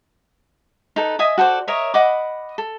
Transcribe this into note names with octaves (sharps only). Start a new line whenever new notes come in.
D#4 A4 B4
D#5 E5 G#5 D#6
F#4 A4 C5 D5
A#4 C#5 D#5 E5
D#5 F#5 B5 D6
A4